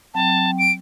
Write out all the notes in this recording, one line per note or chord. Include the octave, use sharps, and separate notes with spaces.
F#3 C4 G5 A5
D7